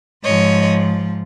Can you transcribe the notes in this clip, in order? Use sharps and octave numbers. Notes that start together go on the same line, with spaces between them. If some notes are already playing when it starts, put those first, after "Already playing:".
G#2 F3 C#5 D#5